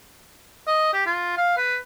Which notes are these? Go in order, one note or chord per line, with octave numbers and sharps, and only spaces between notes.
D#5
G4
F4
F5
B4